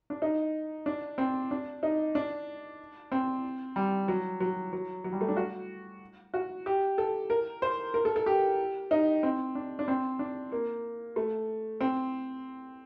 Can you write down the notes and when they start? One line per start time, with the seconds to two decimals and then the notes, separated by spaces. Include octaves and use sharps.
0.10 D4
0.22 D#4
0.86 D4
1.18 C4
1.51 D4
1.83 D#4
2.15 D4
3.12 C4
3.76 G3
4.08 F#3
4.40 F#3
4.73 F#3
5.04 F#3
5.13 G3
5.21 A3
5.28 D4
5.37 F#4
6.34 F#4
6.66 G4
6.98 A4
7.30 A#4
7.62 C5
7.94 A#4
8.05 A4
8.16 A4
8.26 G4
8.91 D#4
9.23 C4
9.55 D4
9.79 D4
9.88 C4
10.19 D4
10.52 A#3
11.16 A3
11.81 C4